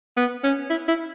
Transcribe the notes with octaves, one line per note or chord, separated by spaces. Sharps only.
B3
C#4
E4
E4